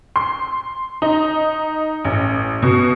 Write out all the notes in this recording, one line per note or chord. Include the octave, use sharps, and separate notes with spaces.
C6
D#4
A1
B2